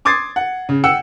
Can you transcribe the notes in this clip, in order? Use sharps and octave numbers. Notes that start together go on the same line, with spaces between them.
C6 D6 D#6 G#6 A6 C7
F#5
C#3
F#5 G5 E6 C#7